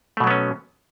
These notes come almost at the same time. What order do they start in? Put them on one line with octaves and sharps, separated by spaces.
A3 B2 F#3 B3 C#4